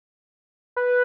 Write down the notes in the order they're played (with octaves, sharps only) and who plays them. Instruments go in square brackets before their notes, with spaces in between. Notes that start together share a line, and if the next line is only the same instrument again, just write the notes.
[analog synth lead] B4